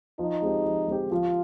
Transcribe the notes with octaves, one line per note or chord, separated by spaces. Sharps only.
F3 D#4
G#3 C4 G4
F3
G#3 C4 G4
F3 F4